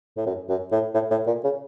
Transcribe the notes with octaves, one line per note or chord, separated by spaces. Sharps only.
A2
F#2
F#2
A2
A2
A2
A#2
C#3